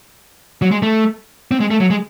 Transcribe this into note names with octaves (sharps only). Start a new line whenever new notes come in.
F#3
G#3
A3
C4
G#3
A3
F#3
G#3